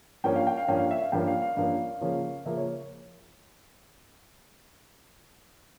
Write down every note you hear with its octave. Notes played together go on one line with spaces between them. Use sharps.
G2 F3 A#3 C#4 G5
F5
G5
F5
G2 F3 A#3 C#4 G5
F5
E5
F5
G2 F3 A#3 C#4 G5
F5
F5
G2 F3 A#3 C#4 F5
C#3 F3 A#3 C#4
C#3 F3 A#3 C#4 E5
C#5